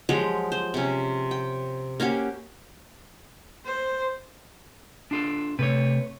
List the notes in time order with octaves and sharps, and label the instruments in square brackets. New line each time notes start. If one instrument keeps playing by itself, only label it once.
[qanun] F3 F#3 G#3 G4
C5
C3 C#4
G5
A#3 C#4 F#4 G4
[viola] C5
[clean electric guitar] D4 F4 A4
[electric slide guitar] C3 A3 [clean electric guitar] B4 C#5